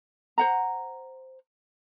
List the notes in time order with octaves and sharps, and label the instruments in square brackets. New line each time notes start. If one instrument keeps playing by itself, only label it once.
[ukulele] C5 F#5 A#5